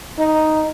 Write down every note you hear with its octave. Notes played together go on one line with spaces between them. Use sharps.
D#4